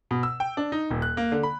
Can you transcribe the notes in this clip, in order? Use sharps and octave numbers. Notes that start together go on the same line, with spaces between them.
B2
E6
G5
D4
D#4
D#1
F#6
A#3
D3
B5